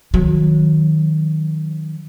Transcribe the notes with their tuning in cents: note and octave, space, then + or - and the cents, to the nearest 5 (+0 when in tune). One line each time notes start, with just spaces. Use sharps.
D#3 +0 F#3 -25